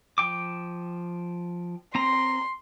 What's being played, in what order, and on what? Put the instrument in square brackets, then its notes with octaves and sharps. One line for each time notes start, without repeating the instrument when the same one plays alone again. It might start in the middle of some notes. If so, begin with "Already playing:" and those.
[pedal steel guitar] F3 G5 D6
[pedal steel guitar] C4 A#5 [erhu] C6